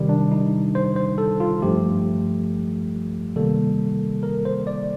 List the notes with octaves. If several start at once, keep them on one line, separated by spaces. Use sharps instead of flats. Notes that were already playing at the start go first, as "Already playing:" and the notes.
Already playing: C3 D#3 G3
D4
D#4
C5
C5
A4
F4
G2 F3 A3 G4
C3 D#3 G3 A#3 A4
A#4
C5
D5